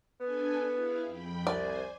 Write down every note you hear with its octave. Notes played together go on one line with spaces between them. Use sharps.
B3 D4 A4 G#5
E4 G#4 F5
F2 G5 B5
C2 C5 D5 G#5